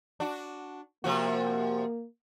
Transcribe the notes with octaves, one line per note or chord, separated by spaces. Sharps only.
D4 F#4
C3 F3 A#3 F#4